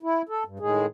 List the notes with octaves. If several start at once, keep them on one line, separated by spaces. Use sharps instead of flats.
E4
A4
G2
A2 D#3 G#3 G#4